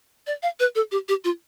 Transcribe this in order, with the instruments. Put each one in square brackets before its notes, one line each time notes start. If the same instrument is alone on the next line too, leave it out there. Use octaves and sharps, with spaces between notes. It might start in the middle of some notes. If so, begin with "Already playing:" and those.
[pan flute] D5
F5
B4
A4
G4
G4
F4